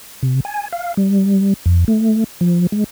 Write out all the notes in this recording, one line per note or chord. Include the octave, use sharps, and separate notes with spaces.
C3
G#5
F5
G3
F2
A3
F3
G#3